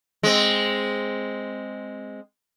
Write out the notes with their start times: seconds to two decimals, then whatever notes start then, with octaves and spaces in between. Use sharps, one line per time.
0.23 G#3 C4